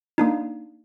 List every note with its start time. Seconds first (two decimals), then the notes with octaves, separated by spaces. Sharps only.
0.18 A#3 D4 D#4